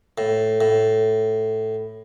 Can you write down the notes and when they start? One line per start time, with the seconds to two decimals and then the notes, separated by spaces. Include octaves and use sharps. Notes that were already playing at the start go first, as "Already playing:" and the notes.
0.18 A2
0.61 A2